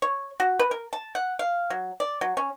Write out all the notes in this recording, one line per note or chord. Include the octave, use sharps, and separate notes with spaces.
C#5
F#4
B4
A#4
A5
F#5
F5
F#3
D5
F#3
C#4